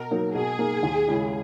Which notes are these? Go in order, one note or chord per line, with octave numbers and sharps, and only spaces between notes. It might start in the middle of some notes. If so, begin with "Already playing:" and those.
Already playing: B2 A#4
F#3 A#3 D#4
B2 G#4
A#3 D#4
D#2
C#3 G#3 C#4 E4